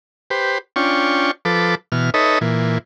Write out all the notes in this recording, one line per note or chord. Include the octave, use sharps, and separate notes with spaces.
G4 B4 C5
C#4 D4 F4 G5 C#6
F3 A4 B4 D6
B2 E3 F6
D#4 A4 B4 C#5 D#5 E5
A#2 E3